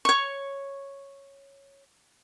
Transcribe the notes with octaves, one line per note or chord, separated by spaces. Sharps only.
C#5 C#6